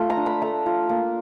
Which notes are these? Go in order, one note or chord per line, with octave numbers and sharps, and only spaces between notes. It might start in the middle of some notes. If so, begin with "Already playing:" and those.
Already playing: A3 F4
A#5
D4
B5
A3 A#5
F4
A#3